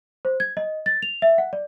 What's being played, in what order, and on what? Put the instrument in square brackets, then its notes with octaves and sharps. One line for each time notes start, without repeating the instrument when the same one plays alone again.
[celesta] C5
G#6
D#5
A6
F7
E5
F#5
D5